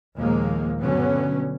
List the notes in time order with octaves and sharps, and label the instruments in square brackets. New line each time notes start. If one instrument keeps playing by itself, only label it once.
[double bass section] D#2 A#2 D#3 F3 G#3 A#3
G2 B2 D3 F#3 B3 C#4